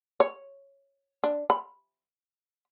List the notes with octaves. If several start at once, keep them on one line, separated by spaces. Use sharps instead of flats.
C#5
D4
B5